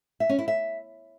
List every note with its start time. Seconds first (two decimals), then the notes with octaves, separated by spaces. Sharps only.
0.20 E5
0.29 C#4
0.39 E4
0.48 E5